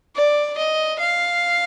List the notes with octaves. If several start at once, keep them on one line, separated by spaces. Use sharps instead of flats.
D5
D#5
F5